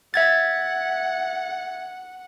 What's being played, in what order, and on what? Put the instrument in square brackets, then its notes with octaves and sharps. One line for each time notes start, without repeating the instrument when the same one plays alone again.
[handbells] E5 G#6 A6 [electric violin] F#5